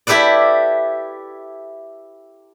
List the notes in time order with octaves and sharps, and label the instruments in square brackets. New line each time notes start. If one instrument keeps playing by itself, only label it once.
[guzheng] E4 G4 A4 B4 D5